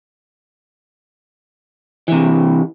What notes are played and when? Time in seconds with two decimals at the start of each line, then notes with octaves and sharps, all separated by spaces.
2.08 C3 E3